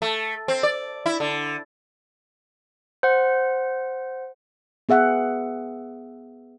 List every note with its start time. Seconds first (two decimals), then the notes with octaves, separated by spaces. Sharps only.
0.02 A3
0.48 C4
0.63 D5
1.06 E4
1.20 D3
3.03 C5 F#5
4.89 B3 G#4 E5 F#5